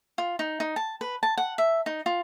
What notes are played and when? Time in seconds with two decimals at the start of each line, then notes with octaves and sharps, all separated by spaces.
0.18 F4
0.39 D#4
0.60 D#4
0.76 A5
1.01 B4
1.23 A5
1.38 F#5
1.58 E5
1.86 D#4
2.06 F4